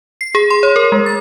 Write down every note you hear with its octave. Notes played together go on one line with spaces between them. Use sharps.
C7
G#4
C6
C#5
A#4
G#3
A6